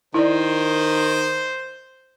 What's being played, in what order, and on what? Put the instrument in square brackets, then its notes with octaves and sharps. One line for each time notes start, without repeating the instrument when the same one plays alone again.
[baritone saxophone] D#3 [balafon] E4 D5 [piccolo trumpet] C5